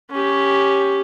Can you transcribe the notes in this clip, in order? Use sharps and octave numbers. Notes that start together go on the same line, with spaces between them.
C#4 G4